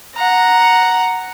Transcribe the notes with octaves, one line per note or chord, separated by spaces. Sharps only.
F#5 A#5